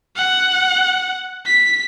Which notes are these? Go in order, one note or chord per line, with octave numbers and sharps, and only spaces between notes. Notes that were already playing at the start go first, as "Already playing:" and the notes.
F#5
B6